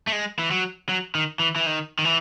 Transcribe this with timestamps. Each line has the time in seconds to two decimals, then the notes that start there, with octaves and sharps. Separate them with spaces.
0.07 A3
0.12 G#3
0.39 E3
0.51 F#3
0.89 F#3
1.15 D#3
1.40 E3
1.56 E3
1.66 D#3
1.99 D#3
2.05 E3